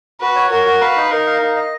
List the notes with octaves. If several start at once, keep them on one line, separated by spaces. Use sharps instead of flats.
F#4 B4
C#5
F#4 A#4
F#4
B4 F5
D#4
D#4 A#4
F5
D#4
D#5